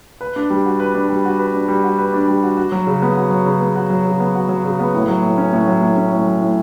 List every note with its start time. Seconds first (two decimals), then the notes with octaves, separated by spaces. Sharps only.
0.21 B4
0.36 D4
0.50 G3
0.65 F#4
0.80 B4
0.94 D4
1.09 G3
1.25 F#4
1.39 B4
1.53 D4
1.68 G3
1.84 F#4
1.98 B4
2.14 D4
2.28 G3
2.43 F#4
2.57 F#4
2.72 F#3
2.87 C#3
3.02 B3
3.16 F#4
3.31 F#3
3.46 C#3
3.61 B3
3.75 F#4
3.90 F#3
4.06 C#3
4.20 B3
4.35 F#4
4.49 F#3
4.64 C#3
4.79 B3
4.94 A2
5.08 F#3
5.23 A2
5.38 C#4
5.53 A2
5.68 F#3
5.82 A2
5.97 C#4
6.12 A2
6.27 F#3
6.41 A2